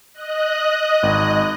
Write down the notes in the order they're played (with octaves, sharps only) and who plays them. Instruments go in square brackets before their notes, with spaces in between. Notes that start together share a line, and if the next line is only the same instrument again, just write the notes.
[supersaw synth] D#5 F#6
[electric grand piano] G#1